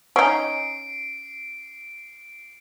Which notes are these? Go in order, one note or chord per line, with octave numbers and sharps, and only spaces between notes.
C#4 D#4 C7 D7